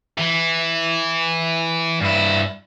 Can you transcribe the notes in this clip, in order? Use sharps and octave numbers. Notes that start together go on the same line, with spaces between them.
E3
G2 E4